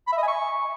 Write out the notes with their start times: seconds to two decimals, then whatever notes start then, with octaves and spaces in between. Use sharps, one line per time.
0.07 B5
0.12 E5
0.17 D#5
0.23 G#5
0.28 C#6